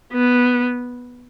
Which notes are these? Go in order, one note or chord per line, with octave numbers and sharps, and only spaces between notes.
B3